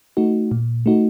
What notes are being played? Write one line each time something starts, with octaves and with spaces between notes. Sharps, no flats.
A3 D#4 F#4
A#2
A3 D#4 F#4